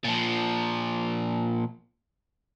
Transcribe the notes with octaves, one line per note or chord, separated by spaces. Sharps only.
A#2 F3